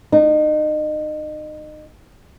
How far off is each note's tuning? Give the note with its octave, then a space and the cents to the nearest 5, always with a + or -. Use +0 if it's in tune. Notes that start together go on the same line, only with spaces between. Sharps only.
D#4 -30